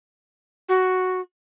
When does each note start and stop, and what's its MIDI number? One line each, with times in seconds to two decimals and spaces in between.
0.68 1.20 66